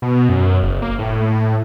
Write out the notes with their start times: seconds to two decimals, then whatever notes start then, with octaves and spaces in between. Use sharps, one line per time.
0.02 B2
0.29 F#2
0.63 F#1
0.82 A#3
0.99 A2